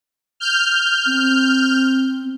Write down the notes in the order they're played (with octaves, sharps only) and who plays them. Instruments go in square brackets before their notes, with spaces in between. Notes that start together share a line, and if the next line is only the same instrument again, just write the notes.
[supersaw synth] F6 G6
[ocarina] C4